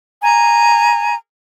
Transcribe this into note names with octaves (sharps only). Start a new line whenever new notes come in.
G#5 A#5